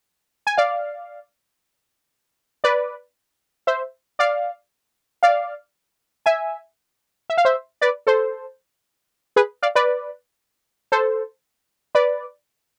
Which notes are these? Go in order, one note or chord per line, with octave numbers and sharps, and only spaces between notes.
G#5
D5 F5
B4 D5
C5 E5
D5 F5
D5 F5
E5 G#5
E5
F5
C5 E5
B4 D5
A4 C5
G#4 B4
D5 F5
B4 D5
A4 C5
B4 D5